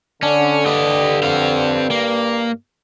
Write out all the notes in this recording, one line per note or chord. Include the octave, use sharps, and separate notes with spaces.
D3 C#4 D4
G2 G4 D#5
C4 F5
A#3